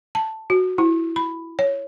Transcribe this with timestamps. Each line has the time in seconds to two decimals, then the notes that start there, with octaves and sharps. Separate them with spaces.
0.15 A5
0.50 F#4
0.78 E4
1.16 B5
1.59 C#5